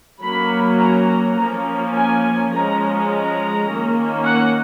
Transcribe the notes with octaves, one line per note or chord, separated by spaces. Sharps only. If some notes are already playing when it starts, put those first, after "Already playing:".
F#3 A#3 C#4 B5
A#5
A#5
F3 A#3 C#4 A#5
G#5
F3 G#3 C#4 A#5
A#5
D#3 A#3 C#4
F#5